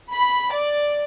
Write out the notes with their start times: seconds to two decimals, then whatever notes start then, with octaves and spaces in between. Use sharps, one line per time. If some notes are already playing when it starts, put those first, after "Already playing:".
0.11 B5
0.52 D5